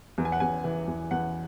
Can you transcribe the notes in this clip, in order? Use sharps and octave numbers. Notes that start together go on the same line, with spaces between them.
E2
G#5
F#5
E2 G#5
E3
E2
E2 F#5